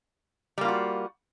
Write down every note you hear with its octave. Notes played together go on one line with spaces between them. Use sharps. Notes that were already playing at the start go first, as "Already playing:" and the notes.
G3 A#3 F4 F#4